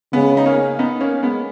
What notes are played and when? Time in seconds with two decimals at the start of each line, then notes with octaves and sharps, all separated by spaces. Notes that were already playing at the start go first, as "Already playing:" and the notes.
0.13 C#3 G#3 B3
0.37 D#4
0.46 A#3 C#4
0.79 B3 D#4
1.00 A#3 C#4
1.23 G#3 B3